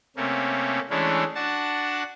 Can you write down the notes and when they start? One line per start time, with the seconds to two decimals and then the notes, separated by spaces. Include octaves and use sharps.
0.17 C3 A3 A#3 C#4
0.90 E3 G#3 A3 C#4 D4
1.35 D4 F#4 F#5 A5